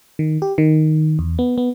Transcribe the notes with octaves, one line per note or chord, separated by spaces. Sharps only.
D#3
G4
D#3
E2
B3
B3